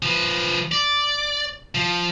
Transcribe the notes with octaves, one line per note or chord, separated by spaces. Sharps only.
F3 B4
D5
F3